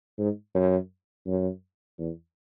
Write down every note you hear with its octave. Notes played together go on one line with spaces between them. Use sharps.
G#2
F#2
F#2
E2